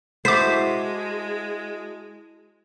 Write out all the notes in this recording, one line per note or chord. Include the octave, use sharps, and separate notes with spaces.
G#3 E4 F#4 C5 A5 D6 B6